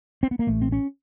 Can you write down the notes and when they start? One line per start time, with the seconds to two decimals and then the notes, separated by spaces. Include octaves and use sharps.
0.23 C4
0.31 B3
0.39 A#3
0.47 A1 A3
0.62 C4
0.72 C#4